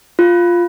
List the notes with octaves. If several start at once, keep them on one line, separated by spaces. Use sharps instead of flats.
F4